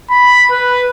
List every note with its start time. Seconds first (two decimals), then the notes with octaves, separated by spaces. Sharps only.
0.11 B5
0.51 B4